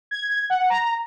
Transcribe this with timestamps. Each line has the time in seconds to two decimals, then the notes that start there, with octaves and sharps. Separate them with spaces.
0.11 G#6
0.50 F#5
0.70 A#5